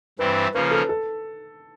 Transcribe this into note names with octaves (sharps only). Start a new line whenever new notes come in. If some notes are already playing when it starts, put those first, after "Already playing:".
G2 E3 G3 C4 E4 B4
C#3 F3 A#3 C#4 B4
A4
A4